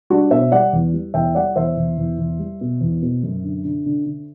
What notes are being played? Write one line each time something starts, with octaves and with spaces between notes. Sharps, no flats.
G3 D4 F#4
B2 C5 E5
G3 D5 F#5
E2
G3
E2 E5 G5
G3 D5 F#5
E2 C5 E5
E2
E2
E2
G3
B2
E2
B2
F#2
D3
D3
D3
D3